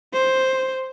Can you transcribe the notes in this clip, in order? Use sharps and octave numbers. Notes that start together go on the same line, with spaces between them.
C5